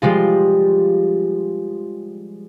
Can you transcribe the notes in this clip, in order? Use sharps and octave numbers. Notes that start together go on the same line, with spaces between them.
F3 G3 G#3 F4